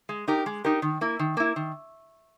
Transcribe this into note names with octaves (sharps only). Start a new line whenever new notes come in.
G#3
D#4 G4 A#4
G#3
D#4 G4 A#4
D#3
A#3 E4
D#3
A#3 E4
D#3